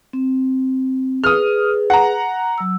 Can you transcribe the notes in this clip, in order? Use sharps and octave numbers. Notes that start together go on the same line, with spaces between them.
C4
G#4 B4 D#6 F6
F#5 A#5
F#3 E6